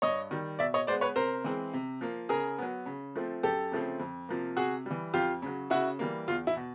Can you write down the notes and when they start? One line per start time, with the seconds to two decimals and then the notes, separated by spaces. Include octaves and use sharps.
0.02 G2 C#5 D#5
0.31 D#3 G3
0.59 B2 D5 E5
0.74 C#5 D#5
0.87 G#3 C5 D5
0.91 B3
1.01 B4 C#5
1.16 C3 A#4 C5
1.44 E3 G#3 C4
1.74 C3
2.01 F3 A#3
2.29 C#3 G#4 A#4
2.58 F#3 B3
2.86 C#3
3.16 F3 A3 C4
3.43 F#2 G4 A4
3.72 C#3 F3 A3 C4
4.00 F2
4.29 C3 F3 A#3
4.57 C3 F#4 G#4
4.86 E3 G3
5.14 F2 F4 G4
5.42 C#3 F#3
5.70 C#3 E4 F#4
5.99 E3 G3 A#3
6.28 E2 F4
6.47 E4
6.56 B2